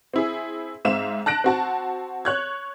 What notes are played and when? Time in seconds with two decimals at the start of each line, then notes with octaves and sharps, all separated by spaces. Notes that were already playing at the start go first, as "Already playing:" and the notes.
0.14 C4 E4 G#4
0.85 G#2 C4 E5 F5 E7
1.26 A5 F#6 A#6 D7
1.44 C4 F#4 A5
2.25 C#5 F#6 G#6